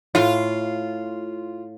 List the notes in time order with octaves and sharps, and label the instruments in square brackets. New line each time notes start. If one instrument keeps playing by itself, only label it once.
[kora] A2 [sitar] F4